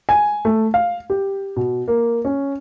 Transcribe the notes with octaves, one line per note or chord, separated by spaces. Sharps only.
G#5
A3
F5
G4
B2
A#3
C#4